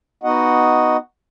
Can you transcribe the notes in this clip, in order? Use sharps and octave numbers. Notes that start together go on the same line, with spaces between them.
B3 D#4 F#4 D#5 F#5